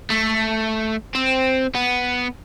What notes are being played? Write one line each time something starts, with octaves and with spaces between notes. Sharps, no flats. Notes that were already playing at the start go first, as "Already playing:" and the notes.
A3
C4
B3